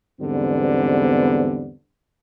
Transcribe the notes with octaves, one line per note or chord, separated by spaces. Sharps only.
E2 G#2 D3 G3 B3 C4